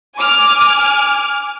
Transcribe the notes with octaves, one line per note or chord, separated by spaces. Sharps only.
G#5 D6 F6